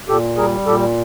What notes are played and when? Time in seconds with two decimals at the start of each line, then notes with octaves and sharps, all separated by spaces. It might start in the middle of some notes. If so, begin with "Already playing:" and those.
0.08 A#2 G4 A4
0.37 G3 G#4 A#4
0.66 A#2 G4 A4